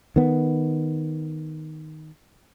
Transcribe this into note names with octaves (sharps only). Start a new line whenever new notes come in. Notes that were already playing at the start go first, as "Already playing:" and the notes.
D#3 B3